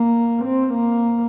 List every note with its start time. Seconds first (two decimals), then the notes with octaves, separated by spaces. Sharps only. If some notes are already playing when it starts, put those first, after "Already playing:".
Already playing: A#3
0.45 C4
0.74 A#3